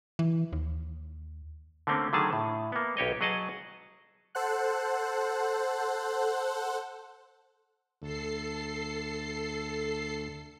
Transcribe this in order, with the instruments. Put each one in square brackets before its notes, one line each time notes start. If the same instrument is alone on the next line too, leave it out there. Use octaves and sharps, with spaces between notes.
[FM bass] E3
D#2
[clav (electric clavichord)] D3 A3 A#3 C4 C#4
D3 D#3 F#3 A3 G#4 A5
A2
A#3 B3
B1 G4 C#5 D#5
F#3 G#4 D#5 F#5 A5
[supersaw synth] A4 C5 F#5 F#6
[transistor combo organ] D2 [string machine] A4 C7